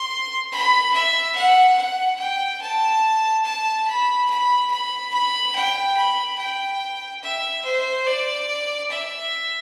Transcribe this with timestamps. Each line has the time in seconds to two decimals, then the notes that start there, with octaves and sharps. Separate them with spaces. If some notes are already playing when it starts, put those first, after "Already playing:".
Already playing: C6
0.52 B5
0.94 E5
1.35 F#5
1.77 F#5
2.20 G5
2.61 A5
3.45 A5
3.88 B5
4.30 B5
4.71 B5
5.13 B5
5.55 G5
5.96 B5
6.38 G5
7.23 E5
7.65 C5
8.06 D5
8.90 E5